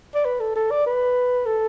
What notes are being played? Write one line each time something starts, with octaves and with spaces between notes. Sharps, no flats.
D5
B4
A4
A4
D5
B4
A4